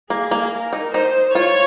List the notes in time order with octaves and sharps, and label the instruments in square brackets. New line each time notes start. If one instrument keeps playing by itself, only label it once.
[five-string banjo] A#3 [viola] G#4
[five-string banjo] A#3
[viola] A#4
[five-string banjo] D#4
[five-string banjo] D#4 [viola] C5
[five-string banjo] F4 [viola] C#5